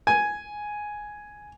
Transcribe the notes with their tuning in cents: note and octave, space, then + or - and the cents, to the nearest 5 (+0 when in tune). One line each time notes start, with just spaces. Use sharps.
G#5 +5